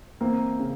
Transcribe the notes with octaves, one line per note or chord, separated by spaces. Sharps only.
E3 A#3 C4
C#3